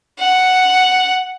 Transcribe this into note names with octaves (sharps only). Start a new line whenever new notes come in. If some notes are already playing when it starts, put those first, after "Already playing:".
F#5